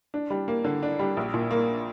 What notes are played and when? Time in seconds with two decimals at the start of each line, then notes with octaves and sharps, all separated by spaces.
0.14 D4
0.30 G3
0.48 A#3
0.64 D3
0.83 D4
0.99 G3
1.17 A#1
1.34 A#2
1.51 A#3